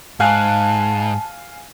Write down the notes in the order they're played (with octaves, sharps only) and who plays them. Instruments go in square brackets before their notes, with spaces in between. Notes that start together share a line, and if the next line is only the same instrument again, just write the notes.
[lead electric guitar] G#2 [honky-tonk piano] F5 G#5 F#6 [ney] A5